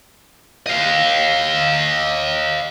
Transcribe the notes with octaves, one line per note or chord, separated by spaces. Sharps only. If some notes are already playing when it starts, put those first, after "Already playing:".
D#5 F5